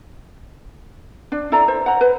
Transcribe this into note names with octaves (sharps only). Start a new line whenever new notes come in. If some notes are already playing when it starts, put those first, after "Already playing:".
D4
E4 A4 D5 A#5
C5
F#5 A#5
B4